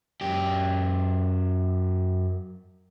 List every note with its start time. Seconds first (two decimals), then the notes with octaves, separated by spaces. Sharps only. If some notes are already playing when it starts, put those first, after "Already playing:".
0.21 F#2 G4